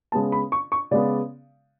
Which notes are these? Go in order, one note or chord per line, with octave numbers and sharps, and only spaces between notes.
C#3 G#3 B3 A5
B5
C#6
C#6
C#3 G#3 B3 D5